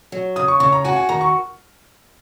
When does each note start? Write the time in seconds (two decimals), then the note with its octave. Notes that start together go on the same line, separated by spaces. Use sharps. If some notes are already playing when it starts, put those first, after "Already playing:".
0.12 F#3
0.36 C#3 D#6
0.48 C#6
0.60 C#3 C#6
0.72 A#5
0.85 F#4 G#5
0.96 G#5
1.09 D#3 A#5
1.21 C#6